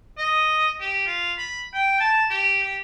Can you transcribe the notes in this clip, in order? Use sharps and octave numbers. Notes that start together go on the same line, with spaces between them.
D#5
G4
F4
B5
G5
A5
G4
G4